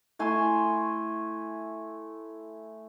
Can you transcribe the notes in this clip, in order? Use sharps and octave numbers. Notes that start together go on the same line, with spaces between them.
A3 E4 G#5 C6